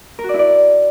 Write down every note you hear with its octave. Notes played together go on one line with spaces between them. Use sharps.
A#4
F#4
D5
E4
D5